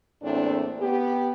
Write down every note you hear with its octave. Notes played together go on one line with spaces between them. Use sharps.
E2 A2 A#3 C4 D4
B3 G4